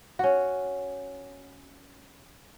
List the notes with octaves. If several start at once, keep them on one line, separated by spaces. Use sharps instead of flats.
C#4 F#4